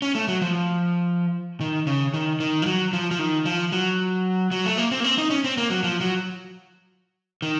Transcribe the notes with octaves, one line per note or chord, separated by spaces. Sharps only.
C#4
A3
F#3
F3
D#3
C#3
D#3
D#3
F3
F#3
F3
F3
D#3
F3
F#3
F#3
A3
A#3
C4
A#3
C4
D#4
C#4
C4
A#3
F#3
F3
F#3
D#3